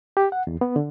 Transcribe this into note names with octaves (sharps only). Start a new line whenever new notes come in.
G4
F#5
E2
B3
D3